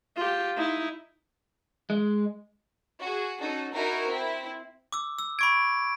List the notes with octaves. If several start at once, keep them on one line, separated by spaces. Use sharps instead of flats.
F4 G4
D#4 E4
G#3
F#4 G#4
C#4 D#4 F#4 A4
D#4 E4 F#4 A#4
C4 E4
D6 E6
E6
B5 C#6 G#6 D7